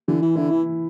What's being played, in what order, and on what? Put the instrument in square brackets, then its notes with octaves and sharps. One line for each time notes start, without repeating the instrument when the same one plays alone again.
[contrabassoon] D3 [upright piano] E3
[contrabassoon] E3
[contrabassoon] D3 [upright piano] E4
[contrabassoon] E3